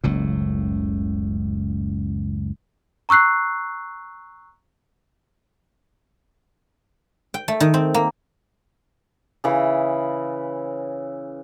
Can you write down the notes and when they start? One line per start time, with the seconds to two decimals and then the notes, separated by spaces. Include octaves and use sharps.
0.04 F#1 C#2 A2
3.09 A#5 C#6 E6 F#6 C7
7.34 G5
7.48 A3
7.60 D#3
7.74 C4
7.94 A#3
9.44 C#3 E3 B4